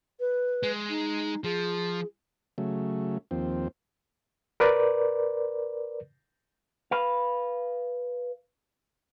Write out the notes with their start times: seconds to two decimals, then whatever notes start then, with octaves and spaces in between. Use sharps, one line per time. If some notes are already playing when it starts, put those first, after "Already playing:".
0.20 B4
0.63 G#3
0.89 D#4
1.44 F3 G#4
2.58 C#3 F#3 A3
3.31 D#2 F3 C4
4.60 A#4 B4 D5
6.91 B4 F5